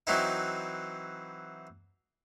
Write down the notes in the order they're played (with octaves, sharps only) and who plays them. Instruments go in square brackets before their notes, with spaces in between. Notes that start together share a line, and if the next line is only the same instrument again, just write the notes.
[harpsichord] E3 F#3 C4 D#4 E4